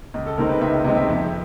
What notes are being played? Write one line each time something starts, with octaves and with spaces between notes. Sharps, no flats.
C#2
A4
C3 D#3 G#3 C4 A#4
B4
C#2 E5
C3 D#3 G#3 C4 D#5
E5
F2 E5